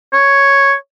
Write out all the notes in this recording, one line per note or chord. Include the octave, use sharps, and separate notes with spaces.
C#5